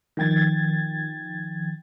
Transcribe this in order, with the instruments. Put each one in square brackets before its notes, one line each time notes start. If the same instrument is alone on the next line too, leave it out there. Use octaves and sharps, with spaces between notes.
[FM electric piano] D#3 F3 G5 G#6 A6